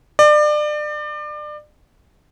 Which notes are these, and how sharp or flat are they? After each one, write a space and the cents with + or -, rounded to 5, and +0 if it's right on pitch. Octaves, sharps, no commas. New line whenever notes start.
D5 +30